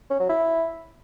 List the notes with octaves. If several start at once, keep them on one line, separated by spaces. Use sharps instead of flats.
C#4
F#3
E4